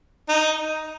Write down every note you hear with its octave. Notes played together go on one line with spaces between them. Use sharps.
D#4